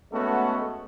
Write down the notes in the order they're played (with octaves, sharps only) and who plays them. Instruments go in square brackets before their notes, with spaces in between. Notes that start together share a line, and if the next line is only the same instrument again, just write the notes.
[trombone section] G#3 A3 B3 C#4 F#4 A4